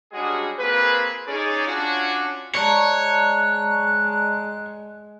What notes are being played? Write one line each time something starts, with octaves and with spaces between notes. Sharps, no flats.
G3 G#3 C#4 D4 F#4 G#4
A#3 C4 F4 G#4 B4
C#4 D#4 G#4 D5
C#4 D4 F4 F#4
G#3 C#5 D5 A5 A#5 F#6